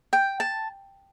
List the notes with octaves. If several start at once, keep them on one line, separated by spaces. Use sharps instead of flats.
G5
A5